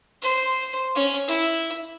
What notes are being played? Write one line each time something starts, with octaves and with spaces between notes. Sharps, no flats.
C5
C#4
E4